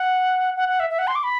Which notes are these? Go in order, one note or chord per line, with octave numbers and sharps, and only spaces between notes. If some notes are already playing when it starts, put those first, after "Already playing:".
Already playing: F#5
F#5
F#5
E5
E5
F#5
C6
D6
B5